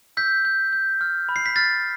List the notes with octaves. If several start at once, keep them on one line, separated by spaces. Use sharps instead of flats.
E6 G6 B6
G6
G6
F6
B5
C7
B6
F6 A6